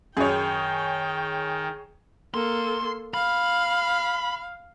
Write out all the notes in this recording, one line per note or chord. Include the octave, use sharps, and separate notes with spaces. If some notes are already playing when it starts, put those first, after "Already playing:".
F#2 D#3 G#4 C#5 G5
A#3 A4 C6
F5 B5